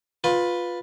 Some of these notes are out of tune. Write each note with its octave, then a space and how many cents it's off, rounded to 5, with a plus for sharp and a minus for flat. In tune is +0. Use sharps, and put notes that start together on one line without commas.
F4 +15 B4 +0